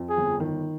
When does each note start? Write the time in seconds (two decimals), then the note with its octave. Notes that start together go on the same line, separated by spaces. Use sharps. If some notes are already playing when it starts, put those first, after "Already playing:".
Already playing: F2
0.10 G#4
0.17 G1
0.40 D#3